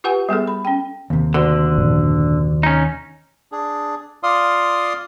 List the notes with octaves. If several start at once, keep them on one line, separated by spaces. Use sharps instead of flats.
F4 G4 B4 F#5 G#5
G3 B3 G#4 A4
B5
C#4 G5
D#2 C3
D2 D3
F#2 A#2 F3
C#4 D#4
D4 G#4
F4 D5 F5 C6 D#6